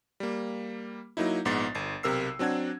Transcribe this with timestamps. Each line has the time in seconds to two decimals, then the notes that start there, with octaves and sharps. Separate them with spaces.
0.20 G3 A#3
1.17 F#3 A#3 D#4 E4
1.45 A#1 G#2 B3 A6 C7
1.75 G1 C7
2.03 B1 C3 A#4 E6 C7
2.39 F#3 C4 D4 F#5 G#6